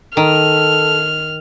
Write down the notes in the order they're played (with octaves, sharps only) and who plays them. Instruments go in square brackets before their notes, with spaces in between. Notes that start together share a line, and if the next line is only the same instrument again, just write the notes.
[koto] D#3 [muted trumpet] A4 [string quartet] F6